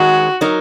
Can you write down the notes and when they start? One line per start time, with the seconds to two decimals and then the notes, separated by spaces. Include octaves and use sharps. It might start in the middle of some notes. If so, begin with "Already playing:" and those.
Already playing: D#3 G#3 C#4 F#4 G#4
0.41 F#3 D#4 A#4